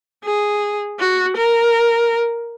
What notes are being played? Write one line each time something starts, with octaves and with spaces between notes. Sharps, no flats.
G#4
F#4
A#4